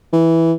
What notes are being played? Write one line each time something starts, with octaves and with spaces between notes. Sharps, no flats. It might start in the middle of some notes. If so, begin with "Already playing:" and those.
E3